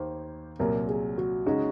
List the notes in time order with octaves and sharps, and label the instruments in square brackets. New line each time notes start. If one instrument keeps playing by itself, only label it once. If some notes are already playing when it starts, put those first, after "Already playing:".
Already playing: [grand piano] D#2 D#3 A#3 [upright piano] C5
[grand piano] C2 A#2 F#3 [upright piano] A#4
[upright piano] G#4
F#4
[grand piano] C#3 G#3 C#4 F#4 [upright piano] D#4